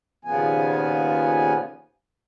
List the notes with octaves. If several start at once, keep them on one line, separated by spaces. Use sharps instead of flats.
D#2 A#2 C#3 F3 B3 G#5